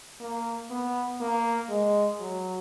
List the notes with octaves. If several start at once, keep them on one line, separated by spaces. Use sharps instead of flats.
A#3
B3
A#3
G#3
F#3